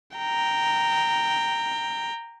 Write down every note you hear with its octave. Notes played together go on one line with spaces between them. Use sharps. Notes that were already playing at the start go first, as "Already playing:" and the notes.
G5 A#5